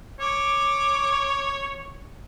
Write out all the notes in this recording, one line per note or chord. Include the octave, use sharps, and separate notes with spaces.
C#5 D6